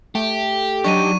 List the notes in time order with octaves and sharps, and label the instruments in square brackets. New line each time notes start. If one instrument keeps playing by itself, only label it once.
[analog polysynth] A3 [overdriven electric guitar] G4
[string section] F#3 [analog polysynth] D4 D#4 [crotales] C#6 D#7